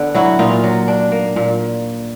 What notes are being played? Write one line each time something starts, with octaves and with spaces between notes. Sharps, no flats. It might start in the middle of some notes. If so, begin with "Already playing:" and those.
Already playing: D3 B3 D4
F#3 E4 F#4
A#2 D#4 F4
F#3
D4
A#3
A#2